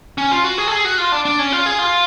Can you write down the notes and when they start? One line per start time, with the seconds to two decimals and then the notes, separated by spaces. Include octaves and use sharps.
0.18 C#4
0.31 F4
0.44 F#4
0.58 G#4
0.67 A4
0.72 G#4
0.85 F#4
0.98 F4
1.12 D4
1.25 D4
1.39 C#4
1.52 F4
1.66 G#4
1.79 F4